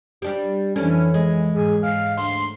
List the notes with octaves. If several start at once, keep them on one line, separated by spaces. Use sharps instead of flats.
G3 D4 G4
F2 E3 C#4 D4 A4
G#3
G#2 G#4
G#2 F5
D2 C6